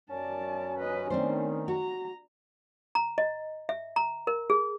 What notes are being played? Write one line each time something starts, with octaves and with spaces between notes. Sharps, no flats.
F#2 C#4 D5 A5
B4 D#5
D#3 A3 B3 C4 D4 C5
F#4 A#5
A#5
D#5
E5
A#5
A#4
G#4